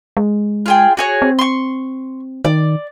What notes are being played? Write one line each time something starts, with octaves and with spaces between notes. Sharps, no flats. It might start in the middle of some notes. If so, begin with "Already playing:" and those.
G#3
F4 G#4 G5
F#4 G#4 C#5
C4
C6 C#6
D#3 D5